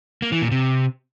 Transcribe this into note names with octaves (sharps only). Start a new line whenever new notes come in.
A#3
E3
A#2
C3